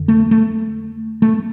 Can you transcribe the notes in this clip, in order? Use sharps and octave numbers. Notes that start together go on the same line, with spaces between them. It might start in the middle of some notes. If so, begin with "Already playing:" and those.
Already playing: F2 D3
A3
A3
A3